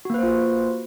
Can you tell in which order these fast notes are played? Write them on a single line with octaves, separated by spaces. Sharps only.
F#4 A#3 B4 C5 F4